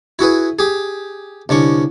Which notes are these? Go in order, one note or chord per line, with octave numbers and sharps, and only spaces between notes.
E4 F#4 G#4 B4
G4 G#4
C2 D3 C#4 C#6